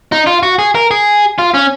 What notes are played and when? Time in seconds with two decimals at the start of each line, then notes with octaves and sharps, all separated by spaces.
0.12 D#4
0.27 F4
0.43 F#4
0.59 G#4
0.75 A#4
0.91 G#4
1.39 F4
1.54 C#4